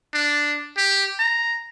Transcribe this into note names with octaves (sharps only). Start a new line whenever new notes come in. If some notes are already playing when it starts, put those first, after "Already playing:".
D4
G4
A#5